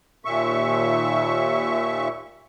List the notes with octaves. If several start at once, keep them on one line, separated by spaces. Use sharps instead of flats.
D#2 A#2 E5 C#6